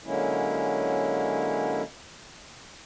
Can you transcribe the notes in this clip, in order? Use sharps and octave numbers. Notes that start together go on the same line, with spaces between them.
D3 F#3 G#3 A#3 C#4 E4